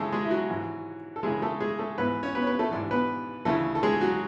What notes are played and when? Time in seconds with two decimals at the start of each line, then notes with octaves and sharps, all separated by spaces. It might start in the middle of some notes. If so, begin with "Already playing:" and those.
Already playing: F#2 C#3 E3 G#3 A3 G#4 A4
0.12 G#3 G#4
0.25 E4
0.31 F#3 F#4
0.50 G#2 E3
1.16 A4
1.23 F#2 C#3 E3 G#3 G#4
1.42 A3 A4
1.60 G#3 G#4
1.79 A3 A4
1.98 G#2 E3 B3 B4
2.23 C#4 C#5
2.35 B3 B4
2.42 C#5
2.47 B3 B4
2.59 A3 A4
2.71 G#2 E3 D4 D5
2.91 B3 B4
3.45 D2 C#3 E3 A3 A4
3.75 A4
3.83 G#3 G#4
4.01 F#3 F#4